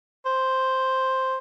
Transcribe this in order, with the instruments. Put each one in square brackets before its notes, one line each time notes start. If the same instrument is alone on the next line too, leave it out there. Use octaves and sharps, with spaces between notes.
[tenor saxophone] C5